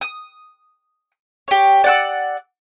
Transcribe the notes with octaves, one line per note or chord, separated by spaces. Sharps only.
D#6
G4 C#5
D5 F#5 E6